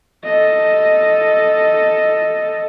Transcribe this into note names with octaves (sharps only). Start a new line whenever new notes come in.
A4 D#5